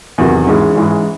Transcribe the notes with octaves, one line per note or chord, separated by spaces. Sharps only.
E2 C3 D#3 F#3
G#2 E3 G#3 C#4
G#2 E3 G#3 C#4